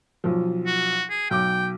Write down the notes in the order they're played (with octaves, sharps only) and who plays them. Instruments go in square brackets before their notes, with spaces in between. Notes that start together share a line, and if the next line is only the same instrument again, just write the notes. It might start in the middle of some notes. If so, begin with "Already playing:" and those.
[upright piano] B1 F3
[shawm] F#4
G#4
[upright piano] B1 D6 [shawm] G5